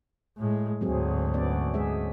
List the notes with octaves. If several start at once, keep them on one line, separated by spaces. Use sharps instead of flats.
A2 G#3
D2 G#2 F#3 C4 G#4
B3 C#4 D5
G#3 G#4 E5